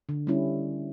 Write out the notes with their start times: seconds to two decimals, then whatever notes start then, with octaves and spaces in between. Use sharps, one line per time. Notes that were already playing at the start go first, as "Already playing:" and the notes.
0.09 D3
0.27 G3 C#4 E4